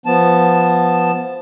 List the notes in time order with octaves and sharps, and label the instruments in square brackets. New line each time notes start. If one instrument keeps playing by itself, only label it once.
[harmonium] F3 B3 A5